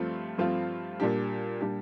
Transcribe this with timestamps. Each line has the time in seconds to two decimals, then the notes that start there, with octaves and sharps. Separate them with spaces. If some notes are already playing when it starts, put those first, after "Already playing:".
Already playing: G2 F3 A3 C4 F4
0.38 G2 F3 A3 C4 F4
1.00 A#2 G3 D4 G4
1.61 A#2 G3 D4 G4